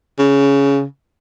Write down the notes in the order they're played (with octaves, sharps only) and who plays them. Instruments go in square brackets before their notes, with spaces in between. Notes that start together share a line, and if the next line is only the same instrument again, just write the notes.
[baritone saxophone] C#3